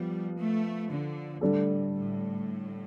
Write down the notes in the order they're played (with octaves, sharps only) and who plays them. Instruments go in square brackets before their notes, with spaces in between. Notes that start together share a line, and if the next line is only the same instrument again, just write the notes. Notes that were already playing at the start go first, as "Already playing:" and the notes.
Already playing: [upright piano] F3 B3 [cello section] G3
[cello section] A3
D3
[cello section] A2 [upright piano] D3 G3 D4 A4
[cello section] A2